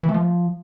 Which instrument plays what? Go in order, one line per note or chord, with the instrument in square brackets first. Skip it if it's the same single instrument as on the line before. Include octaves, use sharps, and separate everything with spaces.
[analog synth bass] E3
A3
F3